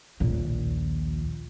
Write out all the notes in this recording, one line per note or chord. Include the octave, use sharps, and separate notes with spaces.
A#1 D#2